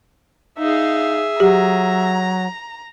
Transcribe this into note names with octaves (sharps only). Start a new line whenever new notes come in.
D#4 G#4 E5 F5
F#3 G4 A#5